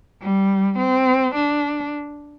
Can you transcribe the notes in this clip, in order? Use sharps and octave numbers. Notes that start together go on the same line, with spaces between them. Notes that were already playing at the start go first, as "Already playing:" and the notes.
G3
C4
D4